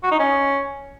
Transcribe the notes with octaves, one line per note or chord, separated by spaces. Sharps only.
F#4
D#4
C#4